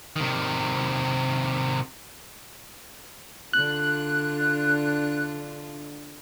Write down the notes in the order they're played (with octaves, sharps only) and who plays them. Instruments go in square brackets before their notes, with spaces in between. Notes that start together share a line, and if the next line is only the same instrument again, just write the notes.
[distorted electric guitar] C3 D#3
[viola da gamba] D3 D4 F4 [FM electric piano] F#6